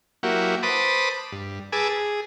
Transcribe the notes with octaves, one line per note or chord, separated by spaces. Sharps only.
F#3 A#3 E4 F#4 G4
B4 C5 A5 B5 D6 D#6
G2
G#4 B4 G#5 A5 D6 E6
G#4